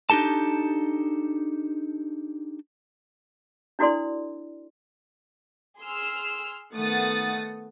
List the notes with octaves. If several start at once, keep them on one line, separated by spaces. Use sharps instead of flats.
D4 D#4 G4 A4 A5
D4 E4 F#4 A4 D5 C6
G#4 C6 E6 F6
D#3 A3 B3 F#5 D#6 A6